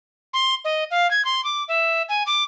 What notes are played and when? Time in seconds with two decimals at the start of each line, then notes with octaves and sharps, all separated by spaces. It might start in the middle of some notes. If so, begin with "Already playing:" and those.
0.34 C6
0.65 D#5
0.91 F5
1.11 G#6
1.25 C6
1.44 D6
1.68 E5
2.09 G#5
2.26 D6